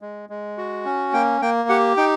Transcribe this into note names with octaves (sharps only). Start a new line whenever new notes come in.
G#3
G#3
F#4
C#4
A#3 G5
A#3 G5
G4 F#5
D#4 G5